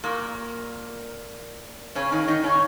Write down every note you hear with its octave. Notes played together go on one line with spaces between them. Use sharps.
A#2 A#3
C#3 C#4
D#3 D#4
D#3 D#4
C#3 C#4